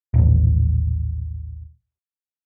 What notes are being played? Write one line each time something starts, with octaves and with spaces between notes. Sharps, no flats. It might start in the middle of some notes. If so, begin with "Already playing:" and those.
D#1 A1